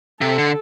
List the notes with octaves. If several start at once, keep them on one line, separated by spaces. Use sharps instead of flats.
C3 A4
D3